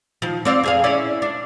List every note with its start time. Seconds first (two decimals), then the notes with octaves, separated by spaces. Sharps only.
0.22 D#3 F3
0.45 C4 D5 F5
0.63 F2 G#4 F5
0.84 C#4 E4 D5
1.22 D4